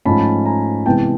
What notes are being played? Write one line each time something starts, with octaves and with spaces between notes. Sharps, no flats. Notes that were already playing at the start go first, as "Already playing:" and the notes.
G#2 F3 A3 C#4 A5 B5
G#5 A#5
C3 E3 G#3 B3 E4 G5 A5